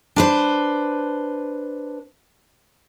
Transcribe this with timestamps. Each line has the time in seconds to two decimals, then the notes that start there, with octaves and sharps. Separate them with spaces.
0.16 D4 B4 C5